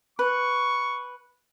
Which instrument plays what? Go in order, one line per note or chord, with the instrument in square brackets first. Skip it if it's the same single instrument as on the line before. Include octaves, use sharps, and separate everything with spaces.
[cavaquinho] B4 [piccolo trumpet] C#6